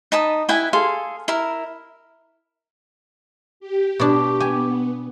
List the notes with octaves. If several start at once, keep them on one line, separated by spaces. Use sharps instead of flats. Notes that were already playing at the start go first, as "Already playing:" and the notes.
D#4 A5 B5 D#6
E4 B4 G5 G#5
G#4 A4 F5 C6
E4 A#4
G4
B2 D4
B3 G4 G#5